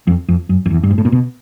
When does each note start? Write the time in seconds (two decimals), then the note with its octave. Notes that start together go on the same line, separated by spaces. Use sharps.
0.07 F2
0.28 F2
0.49 F#2
0.66 F2
0.70 E2
0.83 G2
0.91 G#2
0.98 A2
1.05 A#2
1.12 B2